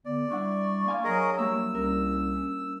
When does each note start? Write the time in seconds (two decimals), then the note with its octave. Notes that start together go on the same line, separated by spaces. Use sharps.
0.06 D3 B3 D5
0.30 G3 D4 E4 F#5 C#6
0.86 A#3 F5 G#5 C6
1.04 F#3 G#4 A#4 D#5
1.38 G3 A#3 E4 E6
1.75 C2 C#4 A#4